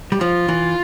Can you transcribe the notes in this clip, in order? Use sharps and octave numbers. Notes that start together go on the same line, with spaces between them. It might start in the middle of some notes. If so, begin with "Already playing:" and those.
G3
F3 F4
E3